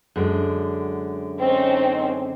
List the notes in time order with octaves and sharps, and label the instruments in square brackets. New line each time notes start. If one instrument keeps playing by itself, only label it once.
[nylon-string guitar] F#2 D3 G#3
[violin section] C4 C#4 D#4